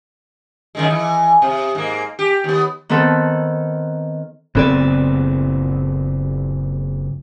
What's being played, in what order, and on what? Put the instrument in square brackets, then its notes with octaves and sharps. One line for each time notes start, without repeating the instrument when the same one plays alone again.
[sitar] F#2 D#3 G#3
E3
C3
G#2 A#3
G4
D#2 B3
[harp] D#3 B3 C4 A4
[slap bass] F#1 A#2 C4 [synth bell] B3 A4 D5